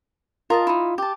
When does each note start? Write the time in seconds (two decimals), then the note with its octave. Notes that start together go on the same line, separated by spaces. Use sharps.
0.50 F4 A#4 D#5 A5
0.67 D#4 E4
0.98 G4 A5